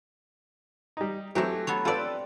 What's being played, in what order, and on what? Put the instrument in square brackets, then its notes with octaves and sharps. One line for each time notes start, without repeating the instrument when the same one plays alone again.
[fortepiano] G3 D#4
[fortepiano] E3 F#3 C4 [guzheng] A3 G4
[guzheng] B3 A4 C#5
[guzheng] C4 D5 [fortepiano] F4 A4 B4